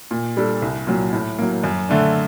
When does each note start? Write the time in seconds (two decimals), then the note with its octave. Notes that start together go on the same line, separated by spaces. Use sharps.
0.11 A#2
0.37 G3 D4 A4
0.62 C2
0.87 A#2 F#3
1.13 A2
1.38 F#3 A#3
1.64 F#2
1.89 D3 A3 D4